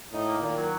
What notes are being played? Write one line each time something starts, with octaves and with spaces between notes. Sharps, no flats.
A2 D#4
A#3
A#2 D#3
F#3